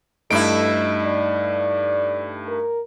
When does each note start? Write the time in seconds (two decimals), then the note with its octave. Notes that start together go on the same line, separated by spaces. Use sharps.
0.31 G2 A3 D#4 E4 A4 D7
1.04 D5
2.48 A#4